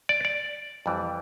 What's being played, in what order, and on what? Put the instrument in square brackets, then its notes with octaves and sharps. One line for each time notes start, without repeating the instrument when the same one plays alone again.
[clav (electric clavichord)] D5
D5
F2 E3 G3